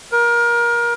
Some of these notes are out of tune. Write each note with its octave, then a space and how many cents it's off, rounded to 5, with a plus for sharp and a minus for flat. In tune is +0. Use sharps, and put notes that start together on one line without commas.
A#4 +25